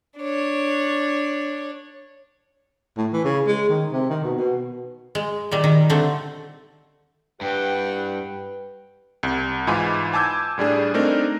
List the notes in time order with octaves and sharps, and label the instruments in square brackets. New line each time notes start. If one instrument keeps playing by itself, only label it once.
[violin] D4 C#5
[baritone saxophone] A2
E3
C#3
G#3
D#3
C3
D#3
B2
B2
[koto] G#3
A#2 D#3 G3
D#3
D3 A3 C4
[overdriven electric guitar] G2 [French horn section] E4 G4 B4 [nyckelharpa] F#5 G5
[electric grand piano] C2
G#2 E3 D#4 F4 G#5 B5
G#5 A5 D6 E6 G6 G#6
A2 G3 D4 G#4
A3 C4 D4 D#4 A#4